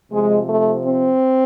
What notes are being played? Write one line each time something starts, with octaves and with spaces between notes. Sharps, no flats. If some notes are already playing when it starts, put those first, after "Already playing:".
C3 F3 G#3
A3
C4